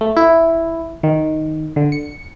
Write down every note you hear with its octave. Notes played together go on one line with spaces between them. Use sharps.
A3
E4
D#3
D3
C#7